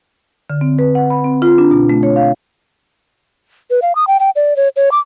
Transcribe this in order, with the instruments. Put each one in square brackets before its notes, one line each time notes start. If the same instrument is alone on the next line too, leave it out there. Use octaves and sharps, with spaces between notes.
[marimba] D3
C4
B4
F#5
B5
C4
F4
D4
B2
A3
C#5
F5
[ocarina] B4
F5
D#6
G5
G5
D5
C#5
C#5
D6